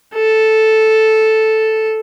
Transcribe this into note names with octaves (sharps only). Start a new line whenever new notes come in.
A4